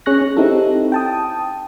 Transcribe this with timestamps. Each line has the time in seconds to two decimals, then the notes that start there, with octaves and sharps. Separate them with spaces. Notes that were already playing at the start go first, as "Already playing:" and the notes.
0.06 C#4 G#4 C#6 F#6 A#6
0.21 C#4
0.37 C4 D#4 E4 G4 A4
0.92 G5 A5 D#6